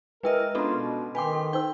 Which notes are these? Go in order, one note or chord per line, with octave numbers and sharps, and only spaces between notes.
G#3 E4 A#4 B4 D#5 G5
B3 C#4 D4 F4 A4 A#5
B2
D#3 B4 G5 G#5 C6 D6
A4
D#4 C5 G5 E6